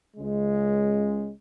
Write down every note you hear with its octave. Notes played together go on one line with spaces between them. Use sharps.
C#2 C#3 G#3